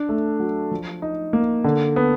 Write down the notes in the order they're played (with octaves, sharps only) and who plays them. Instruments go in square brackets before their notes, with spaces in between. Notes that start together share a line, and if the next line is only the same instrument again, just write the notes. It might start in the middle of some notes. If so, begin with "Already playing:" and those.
Already playing: [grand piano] D4
A3
F#3
F3
D#4
A#3
D3
B3